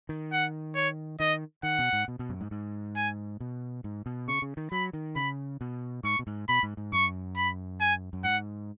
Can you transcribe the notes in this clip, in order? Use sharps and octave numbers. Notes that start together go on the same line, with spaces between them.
D#3
F#5
C#5
D#3 D#5
D#3 F#5
B2
G#2
B2
B2
F#2
G#2
G#2
G#5
B2
G#2
B2
C#3 C#6
C#3
D#3
F#3 B5
D#3
C#3 B5
B2
G#2 C#6
B2
G#2
B2 B5
G#2
G#2
F#2 C#6
B5
G#5
F#2
G#2 F#5